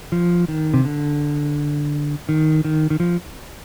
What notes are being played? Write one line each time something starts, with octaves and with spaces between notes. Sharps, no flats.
F3
D#3
C3
D3
D#3
D#3
D#3
F3